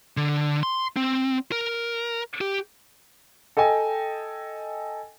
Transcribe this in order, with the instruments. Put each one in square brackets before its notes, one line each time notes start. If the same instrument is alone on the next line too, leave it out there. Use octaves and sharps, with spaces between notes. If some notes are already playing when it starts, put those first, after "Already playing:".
[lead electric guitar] D3
C6
C4
A#4
G4
[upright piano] A4 D#5 G5 G#5